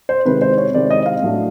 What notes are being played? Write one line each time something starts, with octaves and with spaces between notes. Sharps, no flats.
C5
C3 D#3 G#3 C4 E4 B4
C5
C#5
C3 D#3 G#3 C4 E4 D5
D#5
F5
A2 F#3 A3 D4